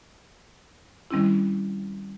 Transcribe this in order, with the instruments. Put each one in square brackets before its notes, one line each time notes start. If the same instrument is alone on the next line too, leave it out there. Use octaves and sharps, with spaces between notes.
[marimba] D#3 G3 C4 C#4 E4